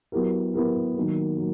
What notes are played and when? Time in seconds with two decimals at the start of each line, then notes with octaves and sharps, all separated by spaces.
0.12 F#3 B3 E4 G4 A#4
0.54 F#3 B3 E4 G4 A#4
0.96 D#3 F#3 A#3
1.37 F#3 A#3